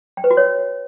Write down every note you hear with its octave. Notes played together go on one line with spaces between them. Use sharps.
G5
B4
F#4
C#5